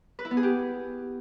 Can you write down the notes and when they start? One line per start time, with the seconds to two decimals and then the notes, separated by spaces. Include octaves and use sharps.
0.19 B4
0.25 E4
0.31 B3
0.37 G#4
0.43 G4